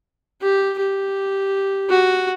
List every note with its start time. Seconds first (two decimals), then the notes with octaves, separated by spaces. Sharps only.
0.42 G4
0.80 G4
1.90 F#4